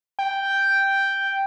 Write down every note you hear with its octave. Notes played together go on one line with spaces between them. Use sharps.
G5